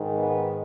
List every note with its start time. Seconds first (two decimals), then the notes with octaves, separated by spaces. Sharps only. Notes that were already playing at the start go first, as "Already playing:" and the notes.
Already playing: G#2 D#3
0.17 B3